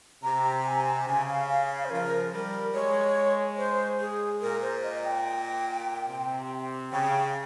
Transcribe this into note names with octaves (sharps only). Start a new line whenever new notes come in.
C3 A#5
G#5
C#3 G#5
F5
F5
F5
C5
F3 A#4
G3 A#4
G#3 C#5
C5
G#4
A#2 A#4
C5
D#5
G5
C3
C#3 G5